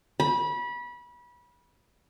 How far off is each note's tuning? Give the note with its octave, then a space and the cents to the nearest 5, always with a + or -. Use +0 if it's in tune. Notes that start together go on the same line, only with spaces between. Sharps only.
B5 -25